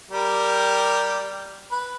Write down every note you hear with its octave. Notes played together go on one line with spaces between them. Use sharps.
G3 G4 A#4
B4